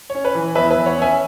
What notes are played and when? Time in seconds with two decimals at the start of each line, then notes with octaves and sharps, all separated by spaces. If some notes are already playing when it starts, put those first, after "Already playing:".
0.10 C#5
0.15 C#4
0.25 B4
0.35 E3
0.55 E2 B4 E5
0.71 B4 E5
0.76 E2
0.86 C#5 F#5
0.97 C#4 E5 G#5